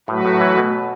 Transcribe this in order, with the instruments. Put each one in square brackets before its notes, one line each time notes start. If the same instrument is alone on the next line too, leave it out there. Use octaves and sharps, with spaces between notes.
[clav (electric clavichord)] A2 [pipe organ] F#3 A3 F#4 B4
[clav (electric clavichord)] A2
E3
B2